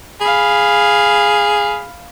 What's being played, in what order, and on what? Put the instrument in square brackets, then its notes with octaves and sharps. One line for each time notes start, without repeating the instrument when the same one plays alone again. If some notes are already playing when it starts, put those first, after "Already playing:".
[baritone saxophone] G#4 [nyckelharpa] F5 B5